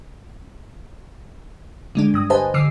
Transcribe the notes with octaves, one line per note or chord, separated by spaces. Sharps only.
D3 G#3 D4
G2 D#6
G4 B4 C5 D#5 G#5 A5
D3 D6 E6 C7